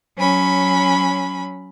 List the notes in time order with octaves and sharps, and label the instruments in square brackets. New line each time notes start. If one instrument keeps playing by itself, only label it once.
[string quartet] F#3 C#4 B5